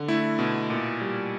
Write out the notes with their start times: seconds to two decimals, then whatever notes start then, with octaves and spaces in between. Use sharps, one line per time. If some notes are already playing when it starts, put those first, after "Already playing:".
Already playing: D3
0.08 A3 E4
0.39 B2
0.70 A#2
1.01 G3